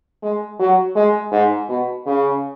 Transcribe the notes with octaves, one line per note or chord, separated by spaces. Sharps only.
G#3
F#3
G#3
G#2
B2
C#3